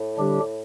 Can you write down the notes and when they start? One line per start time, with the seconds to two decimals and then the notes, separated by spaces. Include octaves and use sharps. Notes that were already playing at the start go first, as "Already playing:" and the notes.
Already playing: A2
0.17 D3 G3 D4 G4